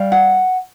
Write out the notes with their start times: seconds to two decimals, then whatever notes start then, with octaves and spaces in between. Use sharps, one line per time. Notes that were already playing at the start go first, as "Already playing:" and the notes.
Already playing: G3 F5
0.12 F#5